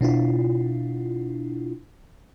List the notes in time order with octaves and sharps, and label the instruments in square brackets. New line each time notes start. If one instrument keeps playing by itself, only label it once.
[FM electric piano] B2 D4 E4 F4